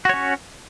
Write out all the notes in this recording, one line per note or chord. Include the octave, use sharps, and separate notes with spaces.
C#4 F#4 C#5